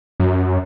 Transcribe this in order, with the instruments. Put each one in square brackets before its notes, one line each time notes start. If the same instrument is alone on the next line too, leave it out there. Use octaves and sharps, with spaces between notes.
[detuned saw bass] F#2